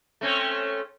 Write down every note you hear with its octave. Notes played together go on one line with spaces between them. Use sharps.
A3 C4 C#4